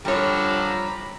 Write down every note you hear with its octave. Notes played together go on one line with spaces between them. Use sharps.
D3 F3 G3 C#5 A#5 B5 D6